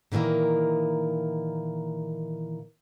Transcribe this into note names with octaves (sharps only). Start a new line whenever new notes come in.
A#2 D#3 E3 A3 A#3